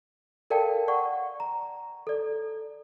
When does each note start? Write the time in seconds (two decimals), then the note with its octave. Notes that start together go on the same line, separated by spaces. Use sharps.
0.50 A4 A#4 D5 F5 G5 A5
0.88 D5 F#5 C#6
1.40 A#5
2.07 A4 D5